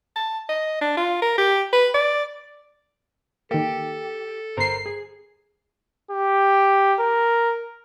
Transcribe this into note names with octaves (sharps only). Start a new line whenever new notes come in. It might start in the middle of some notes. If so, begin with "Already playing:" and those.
A5
D#5
D4
F4
A#4
G4
B4
D5
D#3 A#3 G4 A4
G1 A#4 C5 A#5 C7
G#4
G4
A#4